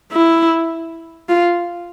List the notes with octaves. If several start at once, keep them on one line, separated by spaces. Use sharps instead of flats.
E4
F4